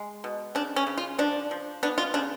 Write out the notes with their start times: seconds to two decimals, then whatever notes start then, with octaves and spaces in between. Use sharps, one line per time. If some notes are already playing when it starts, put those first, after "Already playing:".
Already playing: G#3
0.24 B2
0.55 C#3 D4
0.76 C#4
0.87 C#3
0.98 F4
1.18 F3 D4
1.51 F3
1.83 B3 D4
1.98 F4
2.14 C#3 D4